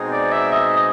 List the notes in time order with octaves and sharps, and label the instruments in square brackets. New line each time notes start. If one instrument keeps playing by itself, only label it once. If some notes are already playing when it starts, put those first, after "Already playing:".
Already playing: [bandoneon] B2 G#3 C4 D#4 G#4
[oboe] D5
E5
D#5
D#5